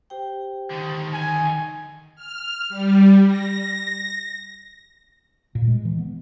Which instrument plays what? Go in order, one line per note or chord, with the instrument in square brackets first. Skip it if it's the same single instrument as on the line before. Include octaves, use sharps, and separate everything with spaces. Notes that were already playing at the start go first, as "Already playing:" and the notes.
[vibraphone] G4 C5 G5
[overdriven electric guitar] D3 D#3
[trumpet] G#5
[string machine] F6
G3
A#6
[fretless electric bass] A#2
G#3
E3
B3